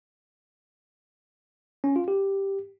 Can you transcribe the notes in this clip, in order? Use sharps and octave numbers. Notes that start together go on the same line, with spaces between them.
C#4
F4
G4